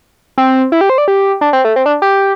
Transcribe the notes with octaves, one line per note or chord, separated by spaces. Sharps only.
C4
E4
G4
C5
D5
G4
D4
C4
A3
C4
D4
G4